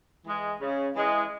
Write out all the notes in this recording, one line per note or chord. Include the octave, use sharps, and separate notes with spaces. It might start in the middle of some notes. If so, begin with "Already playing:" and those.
E3 G#3
C#3
E3 G#3